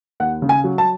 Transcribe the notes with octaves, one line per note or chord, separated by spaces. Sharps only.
D#2 F#5
C#3
G#5
F#3
A5